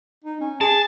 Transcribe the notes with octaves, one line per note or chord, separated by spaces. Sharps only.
D#4
C#4
G#4 A5